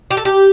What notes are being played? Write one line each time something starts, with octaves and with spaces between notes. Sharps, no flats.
G4
A4
G4